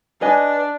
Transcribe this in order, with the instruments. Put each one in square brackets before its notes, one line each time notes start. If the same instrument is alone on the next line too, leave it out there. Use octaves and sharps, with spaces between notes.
[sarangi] D4 [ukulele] B4 D#5 G#5